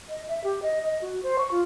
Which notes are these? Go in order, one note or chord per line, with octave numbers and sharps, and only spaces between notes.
D#5
E5
G4
D#5
D#5
F#4
C5
C#6
F4